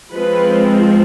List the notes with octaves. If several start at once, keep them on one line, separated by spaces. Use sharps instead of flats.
F3 G#3 C4 B4